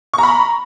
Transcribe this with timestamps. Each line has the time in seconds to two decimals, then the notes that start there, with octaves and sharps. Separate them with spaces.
0.14 C#6
0.18 A#5
0.23 B5